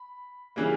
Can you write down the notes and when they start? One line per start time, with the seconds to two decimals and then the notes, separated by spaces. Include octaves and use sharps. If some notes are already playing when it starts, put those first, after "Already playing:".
Already playing: B5
0.56 C#3 E3 G3 A#3